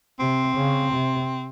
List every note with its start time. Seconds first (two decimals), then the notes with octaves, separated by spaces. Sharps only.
0.19 C3 C4
0.56 C#3
0.93 C3